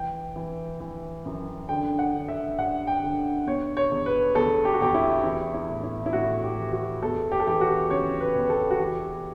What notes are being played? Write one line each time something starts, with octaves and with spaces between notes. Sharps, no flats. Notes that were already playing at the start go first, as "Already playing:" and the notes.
Already playing: E3 G5
E3
E3
F#2
D3 G5
F#5
D3
E5
G2 F#5
G5
D3
B2 C#5
C#5
E2
B4
E2 A4
G4
F#4
E2 G4
E4
E3 E4
E4
A2
E4
E4
A2 F#4
G4
E3
F#4
E2 A4
G4
A4
E3 G4
F#4
C#3 C#5
B4
E2
B4
A4
F#4
E3 G4